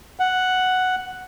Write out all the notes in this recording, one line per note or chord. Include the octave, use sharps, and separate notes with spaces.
F#5